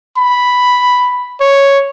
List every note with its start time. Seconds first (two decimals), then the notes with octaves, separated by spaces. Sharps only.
0.17 B5
1.40 C#5